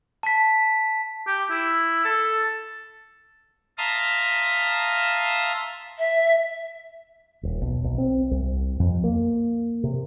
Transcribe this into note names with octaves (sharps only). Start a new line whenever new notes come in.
A5 B6
G4
E4
A4
E5 F5 A5 A#5 C6 D#6
E5
D#1
B1
B1
C4
C2
F2
A#3
C3